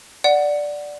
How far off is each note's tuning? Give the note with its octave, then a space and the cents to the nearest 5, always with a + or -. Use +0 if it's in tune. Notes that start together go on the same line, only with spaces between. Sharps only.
D5 +0 F#5 +0